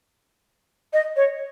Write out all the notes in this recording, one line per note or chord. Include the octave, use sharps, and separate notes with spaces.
D#5
C#5